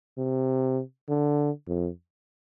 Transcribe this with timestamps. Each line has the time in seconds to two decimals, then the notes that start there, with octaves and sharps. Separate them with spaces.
0.18 C3
1.09 D3
1.68 F2